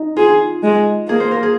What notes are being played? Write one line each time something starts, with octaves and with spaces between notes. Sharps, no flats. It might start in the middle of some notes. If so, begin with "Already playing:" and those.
Already playing: D#4
F4 G#4
G#3
A#3 G#4
C5
A#4
G#4